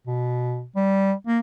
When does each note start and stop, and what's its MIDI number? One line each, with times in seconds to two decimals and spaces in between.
0.07 0.65 47
0.76 1.13 55
1.27 1.39 58